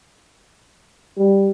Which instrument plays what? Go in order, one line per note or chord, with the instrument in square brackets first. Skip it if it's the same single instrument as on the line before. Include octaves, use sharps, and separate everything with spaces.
[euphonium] G3